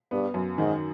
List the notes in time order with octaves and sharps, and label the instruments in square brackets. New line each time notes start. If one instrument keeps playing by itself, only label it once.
[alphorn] G2 [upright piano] B3
[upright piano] F#2
[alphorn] G#2 [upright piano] D#3